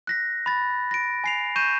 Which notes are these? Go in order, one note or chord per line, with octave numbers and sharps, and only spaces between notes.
F#6 A#6 B6
B5 A6
A#6 D7
G#5 C7 F7
C#6 G6 D#7 E7